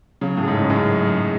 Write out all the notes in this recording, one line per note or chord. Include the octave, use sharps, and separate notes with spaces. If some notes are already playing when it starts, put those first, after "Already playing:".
C#3 F#3
A2
G#4
G#2
F#2
F#3
F#2
F#3
G#4